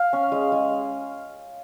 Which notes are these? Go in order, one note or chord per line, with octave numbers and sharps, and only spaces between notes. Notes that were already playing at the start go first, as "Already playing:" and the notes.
Already playing: F5
C#4
G#3
G#3